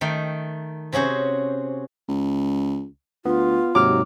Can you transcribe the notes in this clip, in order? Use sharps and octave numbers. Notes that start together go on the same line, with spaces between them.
D#3 A3 D#4 G5
C3 C#4 F#4 G#4 C5
C#2
D2 B3 F4
D#2 G#2 C3 F#3 D6 F6